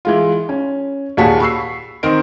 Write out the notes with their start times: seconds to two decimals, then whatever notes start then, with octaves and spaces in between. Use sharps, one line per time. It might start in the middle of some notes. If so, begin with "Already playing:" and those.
0.05 E3 G#3 F4
0.49 C#4
1.17 D#2 A#2 F#4 G#4 A5 B6
1.40 B5 C#6 E6 C7
2.03 D#3 C4 A#4 D#5 D7